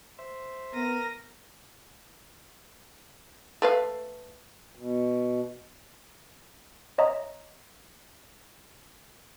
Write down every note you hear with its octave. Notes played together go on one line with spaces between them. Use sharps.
C5 E5
B3 A#4 A#6 D#7
A3 B4 F5
B2
C#5 D#5 E5 A#5